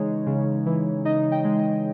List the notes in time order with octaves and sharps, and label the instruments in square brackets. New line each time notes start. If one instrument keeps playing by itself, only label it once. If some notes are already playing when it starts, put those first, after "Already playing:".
Already playing: [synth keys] C#3 E3 G#3 D#4 C#5
C#3
E3
D#4 D#5
D#5 G5
G#3
D#5